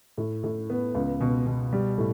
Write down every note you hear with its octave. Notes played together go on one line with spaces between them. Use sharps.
A2
A2
B3
C#2
B2
B2
G3
A2